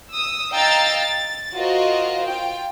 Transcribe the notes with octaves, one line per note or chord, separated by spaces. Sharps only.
D#6 E6
D#5 F5 G5 A#5 E6 A6
A6
F4 F#4 A#4 C5 D#5
F4 G5